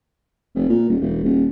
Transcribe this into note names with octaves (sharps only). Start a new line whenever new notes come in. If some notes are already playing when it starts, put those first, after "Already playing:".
F1
A#2
D#1
E1
D#1